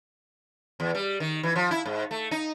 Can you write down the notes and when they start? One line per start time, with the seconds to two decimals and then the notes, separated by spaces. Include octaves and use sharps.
0.80 E2
0.95 G3
1.20 D#3
1.43 E3
1.56 F3
1.71 E4
1.85 G#2
2.11 A3
2.31 D#4